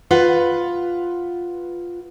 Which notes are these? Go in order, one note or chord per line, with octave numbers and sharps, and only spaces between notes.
F4 B4 F#5